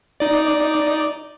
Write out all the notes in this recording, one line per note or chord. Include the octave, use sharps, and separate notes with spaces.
D#4 D5